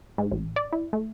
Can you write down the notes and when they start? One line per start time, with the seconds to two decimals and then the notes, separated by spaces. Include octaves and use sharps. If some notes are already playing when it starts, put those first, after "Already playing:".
0.18 G#2
0.32 A1
0.56 D5
0.73 E4
0.93 A3